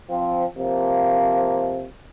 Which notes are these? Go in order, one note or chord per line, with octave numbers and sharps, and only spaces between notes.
F3 C4
C3 F3 A#3